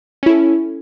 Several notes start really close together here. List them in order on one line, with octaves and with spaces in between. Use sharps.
C#4 E4 A4